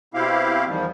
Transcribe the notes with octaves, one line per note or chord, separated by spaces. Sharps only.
B2 C4 E4 G4 F5
E2 D#3 F3 G3